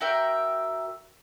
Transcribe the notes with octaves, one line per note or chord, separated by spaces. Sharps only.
F#4 A#4 E5 G5